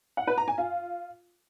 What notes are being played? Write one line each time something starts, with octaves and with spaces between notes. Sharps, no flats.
F#5
B4
A#5
G#5
F4